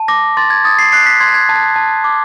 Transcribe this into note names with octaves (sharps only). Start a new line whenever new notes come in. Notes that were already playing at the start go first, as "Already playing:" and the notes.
Already playing: A5
D6 A#6
C6 A6
G#6
D#6 A6
C7
F#6 C7
B6
C6 G#6
G#6
A5
A5
D6